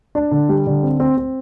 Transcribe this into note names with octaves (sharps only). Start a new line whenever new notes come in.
D4
D3
G3
D3
C4
C4
C4